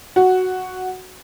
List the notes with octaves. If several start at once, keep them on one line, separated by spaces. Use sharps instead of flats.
F#4